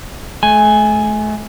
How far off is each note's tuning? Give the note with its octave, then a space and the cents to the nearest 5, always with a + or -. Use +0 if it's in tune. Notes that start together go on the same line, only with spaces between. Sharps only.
A3 -40 G#5 +0